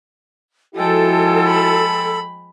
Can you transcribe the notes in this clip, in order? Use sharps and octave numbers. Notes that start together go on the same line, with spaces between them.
F3 G#3 E4 F#4 A4 G5
B5